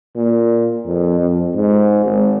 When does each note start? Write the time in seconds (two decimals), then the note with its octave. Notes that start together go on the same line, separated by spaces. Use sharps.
0.16 A#2
0.86 F2
1.20 F2
1.55 G#2
2.05 G#1